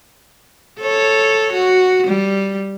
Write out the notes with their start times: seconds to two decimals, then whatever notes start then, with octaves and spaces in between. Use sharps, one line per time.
0.80 A4 C#5
1.53 F#4
2.07 G3